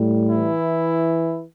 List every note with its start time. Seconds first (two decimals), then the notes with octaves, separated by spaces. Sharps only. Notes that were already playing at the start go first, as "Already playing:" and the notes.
Already playing: A2 G3
0.29 E3 E4